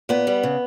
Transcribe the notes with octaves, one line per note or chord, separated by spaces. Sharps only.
A#2 B3
G3
C#3